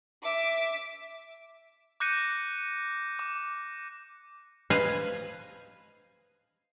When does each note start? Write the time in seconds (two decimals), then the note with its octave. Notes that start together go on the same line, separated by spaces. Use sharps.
0.25 E5 D6
2.00 D6 F#6 G6 A#6 C#7 D#7
3.19 D6
4.70 B4 C5 D#5 F5 G#5 A5